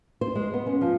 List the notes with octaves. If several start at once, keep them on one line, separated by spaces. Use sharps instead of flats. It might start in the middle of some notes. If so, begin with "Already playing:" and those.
C5
G#3
B3
C#4
F3